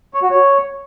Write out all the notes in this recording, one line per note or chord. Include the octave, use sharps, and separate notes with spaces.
C#5
F#4
C#5